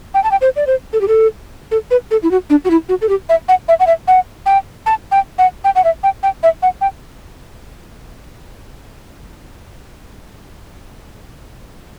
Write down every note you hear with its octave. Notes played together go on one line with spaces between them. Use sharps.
G5
A5
G5
C5
D5
C5
A4
G4
A4
A4
B4
A4
E4
F#4
D4
F#4
E4
F#4
A4
G4
E5
F#5
E5
F#5
E5
F#5
G5
A5
G5
F#5
G5
F#5
E5
G5
G5
E5
F#5
G5